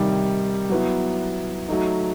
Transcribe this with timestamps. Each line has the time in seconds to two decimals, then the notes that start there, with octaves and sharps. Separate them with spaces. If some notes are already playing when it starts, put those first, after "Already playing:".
Already playing: C3 D#3 G3 D#4
0.70 F#3 B3 E4
1.68 F#3 A3 D#4